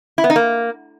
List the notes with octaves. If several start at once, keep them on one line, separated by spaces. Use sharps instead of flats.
E4
B3
D#4
A#3